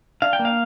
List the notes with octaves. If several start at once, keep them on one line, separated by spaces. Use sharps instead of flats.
D4 F5
G5
A#3
F5